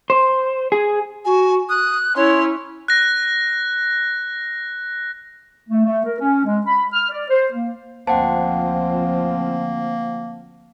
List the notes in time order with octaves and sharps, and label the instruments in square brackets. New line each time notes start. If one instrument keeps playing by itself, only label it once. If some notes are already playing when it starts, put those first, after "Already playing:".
[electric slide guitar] C5
G#4
[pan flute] F#4 [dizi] G#5
[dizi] D#6 [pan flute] F#6
[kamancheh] C#4 E4 [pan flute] C#5 [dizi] C6
[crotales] F#6 A#6
[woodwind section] A3
A3
A#4
C#4
G#3
B5
F6
D5
C5
A#3
[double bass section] D2 F3 C4 [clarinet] A#3 [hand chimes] C5 F#5 G5 [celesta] A5